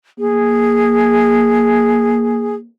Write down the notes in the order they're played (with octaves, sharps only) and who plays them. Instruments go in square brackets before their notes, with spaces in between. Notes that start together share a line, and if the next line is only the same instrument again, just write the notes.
[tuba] A#3 [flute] G#4